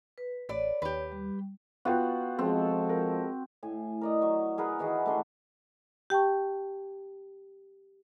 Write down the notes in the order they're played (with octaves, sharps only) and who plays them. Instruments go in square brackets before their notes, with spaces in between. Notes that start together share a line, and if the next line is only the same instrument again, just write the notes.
[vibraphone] B4
[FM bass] A1 [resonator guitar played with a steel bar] B4 D5 [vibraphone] C#5
[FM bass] D#2 [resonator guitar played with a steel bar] G4 B4
[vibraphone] G3
[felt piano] B3 F4 G5 [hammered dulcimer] F#4
[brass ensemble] F3 G#3 A4 [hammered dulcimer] C4
[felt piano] A#4
[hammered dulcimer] A2 G#5
A#4 D5 D#5
F#3 C#6
G#4 A#4 B4 F#5
D#3 E3 F#4 G#4
A3 D4 G#5 C6
[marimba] G4 G5 A5 C#6